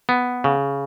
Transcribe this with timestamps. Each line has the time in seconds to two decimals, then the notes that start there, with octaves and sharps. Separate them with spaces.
0.09 B3
0.44 C#3